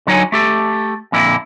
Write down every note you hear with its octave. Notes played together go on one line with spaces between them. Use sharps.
D3 F#3 D#4 C#5 G#5
A3 G4 A4
F2 A#2 D3 E4